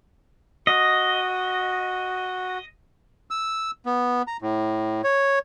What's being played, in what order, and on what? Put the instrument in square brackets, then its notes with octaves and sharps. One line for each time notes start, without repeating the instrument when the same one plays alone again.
[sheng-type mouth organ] F#4 [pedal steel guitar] D#5
[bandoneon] E6
B3
A#5
A2
C#5